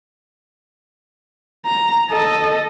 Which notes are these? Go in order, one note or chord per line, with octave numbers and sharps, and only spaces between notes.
A#5
A4 D#5